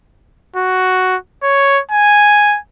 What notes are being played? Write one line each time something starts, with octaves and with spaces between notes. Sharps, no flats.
F#4
C#5
G#5